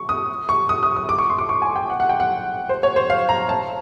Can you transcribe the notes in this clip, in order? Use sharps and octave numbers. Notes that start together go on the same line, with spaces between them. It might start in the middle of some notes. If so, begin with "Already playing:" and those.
Already playing: C#6
D#6
C#6
D#6
D#6
D#6
D6
C#6
C6
D6
C#6
G#5
G5
F#5
F#5
G5
F#5
C5
C#5
C5
F5
A#5
A5